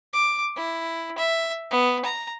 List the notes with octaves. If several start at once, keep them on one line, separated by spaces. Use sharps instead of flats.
D6
E4
E5
B3
A#5